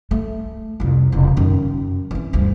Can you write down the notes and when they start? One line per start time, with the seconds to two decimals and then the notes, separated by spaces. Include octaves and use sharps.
0.11 A3
0.80 C2 F2
1.12 E1 C#3
1.37 F#2 D#3
2.11 E3 C4
2.33 D2 G2